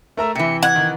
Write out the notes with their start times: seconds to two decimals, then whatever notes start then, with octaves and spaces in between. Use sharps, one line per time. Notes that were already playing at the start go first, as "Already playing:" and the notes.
0.17 A3 A#4 E5 A#5
0.35 C3 E3 E5 G5 C#7
0.63 F#5 G#6
0.76 D#3